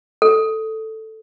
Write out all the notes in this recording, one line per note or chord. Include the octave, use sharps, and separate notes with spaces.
A4